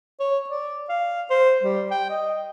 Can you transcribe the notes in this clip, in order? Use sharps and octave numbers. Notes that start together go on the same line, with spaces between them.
C#5
D5
F5
C5
G3
G5
D#5